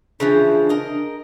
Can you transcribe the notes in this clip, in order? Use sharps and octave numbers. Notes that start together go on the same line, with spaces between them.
C#3 E3 F3 D4
A#4 D#5